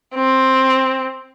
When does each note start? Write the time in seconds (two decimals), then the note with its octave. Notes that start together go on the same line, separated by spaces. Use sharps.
0.15 C4